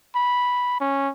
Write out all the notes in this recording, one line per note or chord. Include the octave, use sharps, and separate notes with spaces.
B5
C#4